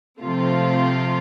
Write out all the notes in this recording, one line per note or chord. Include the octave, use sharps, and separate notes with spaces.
C3 F3 A3 C4 F4